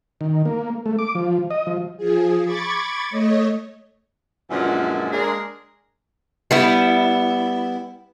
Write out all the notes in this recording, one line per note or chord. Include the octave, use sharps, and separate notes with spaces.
D#3
A#3
A3
D6
F3
D#5
F3
F3 G#4
B5 C#6 D6 G#6 A6
A3 C#5 D#5
F#2 A#2 D3 E3 F3 G#3
G#3 A#3 D4 G#4 A#4
G3 B3 E4